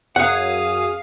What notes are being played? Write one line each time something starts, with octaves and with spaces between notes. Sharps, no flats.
F#2 G#4 F5 F#5 D#6